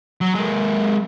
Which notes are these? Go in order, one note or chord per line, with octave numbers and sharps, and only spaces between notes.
F#3
G#3 A#3